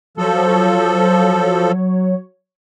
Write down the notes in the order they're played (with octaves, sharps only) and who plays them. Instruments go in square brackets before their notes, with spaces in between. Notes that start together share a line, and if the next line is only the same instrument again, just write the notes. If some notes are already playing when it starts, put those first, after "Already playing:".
[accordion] F3 A4 [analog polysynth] F#3 C#5